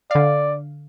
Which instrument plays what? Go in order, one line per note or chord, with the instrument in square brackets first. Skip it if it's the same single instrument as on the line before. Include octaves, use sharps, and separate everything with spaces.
[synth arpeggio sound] D3 F5 [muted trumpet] D5